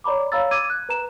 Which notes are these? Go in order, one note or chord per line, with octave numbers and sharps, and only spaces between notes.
C#5 D5 A#5 B5 D6
C#5 F5 A#5 B5 E6 A6
D6 E6 G#6 D#7
F#6
B4 A#5 E7